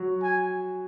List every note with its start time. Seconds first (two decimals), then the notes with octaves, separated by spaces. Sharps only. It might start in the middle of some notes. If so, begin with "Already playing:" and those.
Already playing: F#3 F#4
0.23 G#5